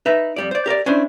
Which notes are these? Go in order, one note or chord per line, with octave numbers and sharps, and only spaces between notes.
D#4 B4 E5
F2 G3 D5
C5 D5
G4 A#4 C5 D5
C#4 D4 E4 C5